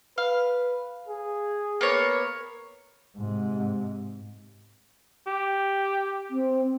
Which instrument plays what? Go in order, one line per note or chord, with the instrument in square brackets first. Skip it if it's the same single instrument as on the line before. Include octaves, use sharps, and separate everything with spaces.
[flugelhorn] B4 [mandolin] F5
[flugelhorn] G#4
[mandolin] A#3 B3 C#5
[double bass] G#2 C3
[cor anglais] G4
[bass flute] C4